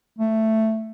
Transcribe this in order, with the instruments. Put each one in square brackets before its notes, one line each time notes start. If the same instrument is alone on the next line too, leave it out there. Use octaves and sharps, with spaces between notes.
[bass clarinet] A3